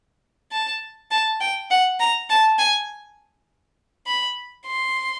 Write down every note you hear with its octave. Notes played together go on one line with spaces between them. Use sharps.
A5
A5
G5
F#5
A#5
A5
G#5
B5
C6